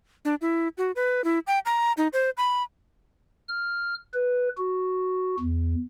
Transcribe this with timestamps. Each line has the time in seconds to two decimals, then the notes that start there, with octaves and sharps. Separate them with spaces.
0.25 D4
0.41 E4
0.78 F#4
0.96 B4
1.24 E4
1.47 G5
1.66 A#5
1.97 D#4
2.13 C5
2.37 B5
3.48 F6
4.14 B4
4.58 F#4
5.40 E2